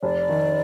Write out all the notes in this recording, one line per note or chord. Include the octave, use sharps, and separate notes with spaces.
F1 D5
D#3